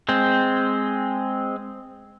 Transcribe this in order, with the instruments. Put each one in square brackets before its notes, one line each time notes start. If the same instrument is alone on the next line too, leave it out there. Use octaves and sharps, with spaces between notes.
[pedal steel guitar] G#3 C4